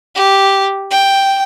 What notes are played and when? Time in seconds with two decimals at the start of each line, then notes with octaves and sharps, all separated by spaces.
0.16 G4
0.91 G5